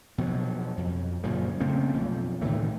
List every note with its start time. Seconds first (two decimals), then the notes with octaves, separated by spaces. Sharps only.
0.18 B2 F3 F#3
0.77 F2
1.23 F#2 A#2 C#3 F3
1.60 C#3 A3 A#3 C4
1.94 B1 F2
2.42 A2 D#3 E3 A3